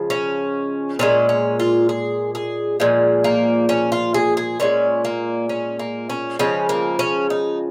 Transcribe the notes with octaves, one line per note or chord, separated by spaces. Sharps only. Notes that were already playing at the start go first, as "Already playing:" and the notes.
Already playing: C#3 F3 G#3
C#4
A#2 F3 G#3 C#4
C#4
F4
G#4
G#4
A#2 F3 G#3
A#3
C#4
F4
G#4
G#4
A#2 G#3 C#4
A#3
C#4
A#3
C#4
C#3 F3 G#3 C#4
A#3
C#4
D#4